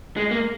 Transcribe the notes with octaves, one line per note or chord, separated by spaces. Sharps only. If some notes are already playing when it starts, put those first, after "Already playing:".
G#3
A#3